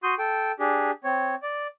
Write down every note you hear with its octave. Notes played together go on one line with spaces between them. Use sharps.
F#4 C6 D#6 G6
A4 G5
D4 G4 G#4
C4 C#5
D5